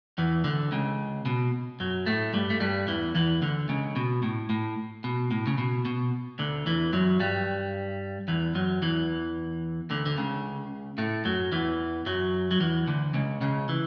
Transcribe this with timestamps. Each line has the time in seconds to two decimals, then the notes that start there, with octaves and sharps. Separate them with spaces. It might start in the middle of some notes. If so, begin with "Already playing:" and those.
0.18 E2 E3
0.44 D2 D3
0.72 C#2 C#3
1.25 B2
1.80 F#2 F#3
2.06 A2 A3
2.34 G2 G3
2.50 A3
2.60 G2 G3
2.88 E2 E3
3.15 E2 E3
3.42 D2 D3
3.69 C#2 C#3
3.96 B2
4.23 A2
4.50 A2
5.04 B2
5.31 A2
5.47 C#3
5.58 B2
5.85 B2
6.39 D2 D3
6.66 E2 E3
6.93 F#2 F#3
7.20 G2 G3
8.28 E2 E3
8.55 F#2 F#3
8.82 E2 E3
9.90 D2 D3
10.06 D3
10.17 C#2 C#3
10.98 A2 A3
11.25 F#2 F#3
11.52 E2 E3
12.06 F#2 F#3
12.51 F#3
12.60 E2 E3
12.88 D2 D3
13.14 C#2 C#3
13.41 C#2 C#3
13.69 E3